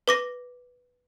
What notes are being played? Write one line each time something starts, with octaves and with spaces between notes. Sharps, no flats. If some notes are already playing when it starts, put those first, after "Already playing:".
B4 D6 A#6